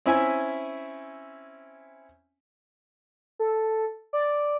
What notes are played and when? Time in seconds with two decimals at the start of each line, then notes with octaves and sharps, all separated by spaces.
0.06 C4 C#4 E4 E5 G#5
3.39 A4
4.13 D5